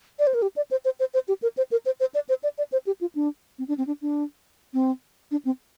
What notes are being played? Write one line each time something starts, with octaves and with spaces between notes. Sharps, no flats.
D5
C5
A#4
G4
D5
C5
C5
C5
C5
G4
A#4
C5
A#4
C5
C5
D5
C5
D5
D5
C5
G4
F4
D4
C4
D4
C4
D4
D4
C4
D4
C4